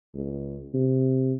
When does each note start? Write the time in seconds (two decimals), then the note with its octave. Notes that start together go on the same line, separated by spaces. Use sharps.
0.15 C#2
0.74 C3